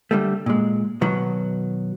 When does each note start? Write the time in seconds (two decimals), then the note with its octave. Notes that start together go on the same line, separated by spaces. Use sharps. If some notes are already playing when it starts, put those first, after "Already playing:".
0.11 D3 G3 A3
0.46 A#2 G#3
1.01 B2 D#3 F#3 B3